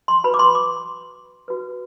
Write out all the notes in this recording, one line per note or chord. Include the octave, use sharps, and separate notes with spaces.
C6
F#4 B4 B5
D6
C6
D6
F#4 B4